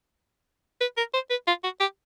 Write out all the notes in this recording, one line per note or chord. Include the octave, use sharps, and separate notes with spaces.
B4
A#4
C5
B4
F4
F#4
G4